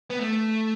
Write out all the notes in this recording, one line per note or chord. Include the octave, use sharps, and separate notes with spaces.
B3
A3